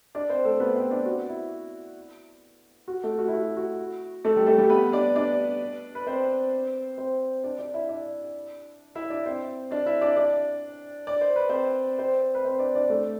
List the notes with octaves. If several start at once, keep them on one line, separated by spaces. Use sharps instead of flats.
D4 D5
C4 C5
A3 A4
B3 B4
C4 C5
D4 D5
F#4
E4
F#4
A3 A4
F#4
E4
F#4
F#4
A3 A4
G3 G4
A3 A4
G3 G4
B3 B4
D4 D5
D4 D5
B4
C4 C5
C4 C5
D4 D5
D4 D5
E4 E5
D4 D5
E4 E5
D4 D5
C4 C5
D4 D5
E4 E5
D4 D5
D4 D5
D5
C5
B4
C4 C5
C4 C5
B4
C4 C5
D4 D5
D4 D5
A3 A4